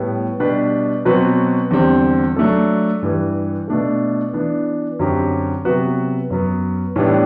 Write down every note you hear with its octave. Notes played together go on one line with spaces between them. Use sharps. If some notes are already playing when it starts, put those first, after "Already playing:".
Already playing: A2 G3 B3
B2 G3 D4 G4 B4
B2 F#3 C4 F#4 B4
E2 D3 G3 C4
F#3 A3 D4 A4
G2 E3 G3
B2 A3 D4 A4
E3 B3 D4
F#2 D3 F#3 C4 G4
C3 F#3 B3 F#4 B4
F#2 F#3 B3
A2 E3 G3 B3 D4